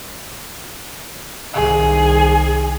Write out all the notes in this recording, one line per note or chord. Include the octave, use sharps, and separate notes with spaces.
C2 D#3 G#4